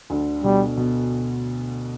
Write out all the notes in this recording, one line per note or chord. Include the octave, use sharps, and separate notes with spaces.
D2 D3
B2 G3
B2